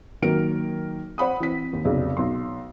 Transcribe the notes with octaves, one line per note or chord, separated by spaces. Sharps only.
D#3 F#3 A#3 A#4 F6 D7
C5 F#5 B5 D#6
E3 C4 B6
D#2
F1 B1 C#3
B1 C6